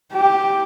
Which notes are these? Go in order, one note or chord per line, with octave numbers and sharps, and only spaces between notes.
G4